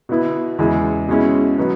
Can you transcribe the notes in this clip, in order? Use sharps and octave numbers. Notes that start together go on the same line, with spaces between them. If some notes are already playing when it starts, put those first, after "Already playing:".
B2 B3 E4
E2 C#3 G#3 E4
B2 G#3 C#4 E4
B2 F#3 B3